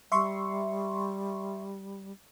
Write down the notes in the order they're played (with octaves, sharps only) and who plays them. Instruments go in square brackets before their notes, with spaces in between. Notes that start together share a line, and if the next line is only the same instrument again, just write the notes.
[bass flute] G3 [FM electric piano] E5 C6 C#6